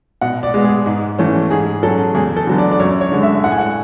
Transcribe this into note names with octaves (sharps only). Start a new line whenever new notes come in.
B2 F#5
D5
G#3 B3
G#4
G#2
E3 A3 C#4
G#2 G#4
F#3 C#4 A4
E2 G#4
A4
D3 F#3 B3
D5
D5
F#2 C#5
C#5
D3 G#3
E5
A2 F#5
G#5
F#5